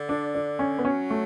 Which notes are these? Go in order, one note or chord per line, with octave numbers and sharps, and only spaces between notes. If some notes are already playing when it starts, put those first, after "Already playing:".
Already playing: D3
D4
D4
C#4
B3
F#3 C#4
A3